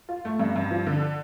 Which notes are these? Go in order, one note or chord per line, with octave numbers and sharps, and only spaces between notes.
F4
A3
G2
G2
F3
D3